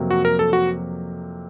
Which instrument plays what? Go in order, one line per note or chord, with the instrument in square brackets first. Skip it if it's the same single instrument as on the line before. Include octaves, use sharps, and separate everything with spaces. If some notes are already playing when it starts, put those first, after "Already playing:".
Already playing: [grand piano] F2 C3 F#3 A#3
[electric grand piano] F#4
A#4
A4
F#4